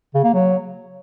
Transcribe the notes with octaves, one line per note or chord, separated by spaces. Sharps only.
C#3
A#3
F#3